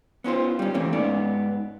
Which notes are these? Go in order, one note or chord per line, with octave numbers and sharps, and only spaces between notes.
B3 C#4 F4 C5
G3 C#4
E3 A3 A#3 C4 C#4
G#2 B3 C#4 D5